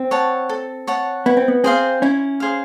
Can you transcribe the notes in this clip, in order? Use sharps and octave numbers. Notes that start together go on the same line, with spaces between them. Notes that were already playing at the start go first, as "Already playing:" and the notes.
Already playing: C4
C#5 F#5 A5
A4
C#5 F#5 A5
B3 E4
C4
B3
C4 G#4 C5 F5
C#4 E4
G#4 C5 F5